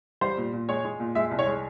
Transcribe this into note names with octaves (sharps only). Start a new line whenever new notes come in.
G3 C5
A#2
A#2
G#3 C#5
G#3
A#2
G#3 E5
C2
C#5
G#3